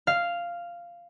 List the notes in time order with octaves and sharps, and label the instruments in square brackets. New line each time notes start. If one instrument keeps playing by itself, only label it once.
[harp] F5